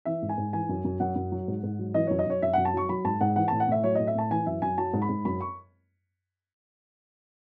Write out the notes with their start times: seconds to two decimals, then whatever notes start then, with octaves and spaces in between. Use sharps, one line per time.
0.05 E3 E5
0.22 G#2
0.29 G#5
0.38 G#2
0.53 E3 G#5
0.69 F#2
0.84 F#2
1.00 F#2 F#5
1.16 F#2
1.32 F#3
1.48 G#2
1.63 G#2
1.79 F#3
1.94 E3 D#5
2.07 F#2 C#5
2.19 D#5
2.26 F#2 C#5
2.42 F#2 E5
2.53 F#2 F#5
2.65 A5
2.74 F#3 C#6
2.89 F#3 B5
3.04 G#2 A5
3.21 G#2 F#5
3.36 E3 F#5
3.48 A2 A5
3.60 F#5
3.68 A2 E5
3.84 F#3 C#5
3.95 A2 D#5
4.07 E5
4.15 A2 A5
4.31 E3 G#5
4.46 F#2 E5
4.62 F#2 G#5
4.78 F#3 A5
4.93 G#2
5.02 B5
5.09 G#2
5.25 F#2 B5
5.41 C#6